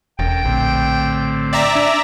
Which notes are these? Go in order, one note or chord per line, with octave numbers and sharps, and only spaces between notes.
E1 C#3 A4 A#4 G5
A#1 A2 D3 C4
D5 E5 G5 A#5
D4 G#5